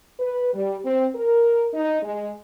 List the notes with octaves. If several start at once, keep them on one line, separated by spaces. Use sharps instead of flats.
B4
G3
C4
A#4
D#4
G#3